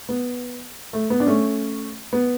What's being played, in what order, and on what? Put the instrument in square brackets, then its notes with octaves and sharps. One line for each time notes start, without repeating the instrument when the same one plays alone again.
[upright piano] B3
A3
B3
D4
A3 C#4
B3